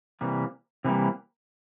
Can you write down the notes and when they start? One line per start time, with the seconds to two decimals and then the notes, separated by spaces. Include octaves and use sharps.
0.21 C3 E3 G3 A#3
0.84 C3 E3 G3 A#3